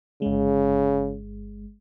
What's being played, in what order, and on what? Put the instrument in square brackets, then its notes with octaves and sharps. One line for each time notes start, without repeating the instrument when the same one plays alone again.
[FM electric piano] G1 G#3 [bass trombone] C#3